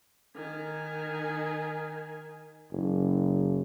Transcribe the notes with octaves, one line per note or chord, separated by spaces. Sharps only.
D#3 G#5
F#1